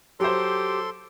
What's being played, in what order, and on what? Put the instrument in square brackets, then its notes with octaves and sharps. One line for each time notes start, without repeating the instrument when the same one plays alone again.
[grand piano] F#3 C5 [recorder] G4 [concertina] A4 C6